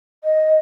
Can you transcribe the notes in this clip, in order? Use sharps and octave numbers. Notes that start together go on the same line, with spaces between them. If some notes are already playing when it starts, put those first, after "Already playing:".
D#5